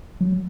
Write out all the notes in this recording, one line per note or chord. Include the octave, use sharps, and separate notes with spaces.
F#3